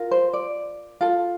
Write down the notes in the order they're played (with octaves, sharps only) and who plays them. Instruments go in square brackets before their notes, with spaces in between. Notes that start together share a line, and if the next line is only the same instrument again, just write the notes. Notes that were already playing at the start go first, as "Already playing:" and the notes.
Already playing: [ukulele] F4 A#4
C5
D5
F4 A4